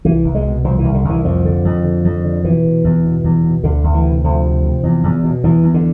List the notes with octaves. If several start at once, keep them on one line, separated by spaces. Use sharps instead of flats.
C2 E3
C2
G#3
B2
C2 F3
C2 E3
D3
C2 E3
F2 F3
D3
F2
D3
F2
D3
B2 E3
B2
E2
B2
E2
B2
D2 D3
D2
E3
C3
D2 F3
C3
C3
E2
E2
B2
E2 E3
E2
D3